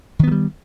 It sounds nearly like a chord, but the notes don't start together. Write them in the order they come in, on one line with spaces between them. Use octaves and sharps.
D#3 B3 F#3 G3